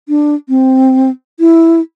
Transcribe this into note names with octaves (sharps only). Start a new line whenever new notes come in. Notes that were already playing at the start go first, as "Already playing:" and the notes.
D4
C4
E4